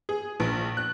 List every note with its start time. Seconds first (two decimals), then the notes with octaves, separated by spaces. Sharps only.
0.09 G#4
0.40 A#1
0.77 F#6